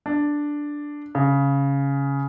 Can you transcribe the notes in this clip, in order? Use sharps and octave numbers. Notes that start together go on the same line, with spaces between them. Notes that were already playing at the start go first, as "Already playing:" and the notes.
D4
C#3